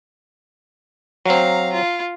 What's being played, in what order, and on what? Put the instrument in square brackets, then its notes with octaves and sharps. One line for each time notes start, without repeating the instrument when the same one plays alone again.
[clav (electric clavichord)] F#3 C4 [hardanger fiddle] F5 A#5
[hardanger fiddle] F4